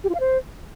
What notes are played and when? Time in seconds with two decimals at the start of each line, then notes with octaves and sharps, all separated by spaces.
0.04 G4
0.09 F4
0.15 F5
0.20 C5